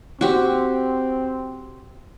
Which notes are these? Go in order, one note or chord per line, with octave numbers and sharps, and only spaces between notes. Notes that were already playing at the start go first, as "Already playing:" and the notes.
C4 F#4 G4